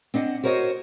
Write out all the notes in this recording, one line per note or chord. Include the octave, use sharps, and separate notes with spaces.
C4 D4 D#5 F#5
F#4 A#4 C5 C#5 D#5